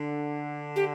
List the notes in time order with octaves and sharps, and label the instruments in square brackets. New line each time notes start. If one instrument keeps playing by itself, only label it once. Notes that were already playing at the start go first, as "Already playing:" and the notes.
Already playing: [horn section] D3
[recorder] G4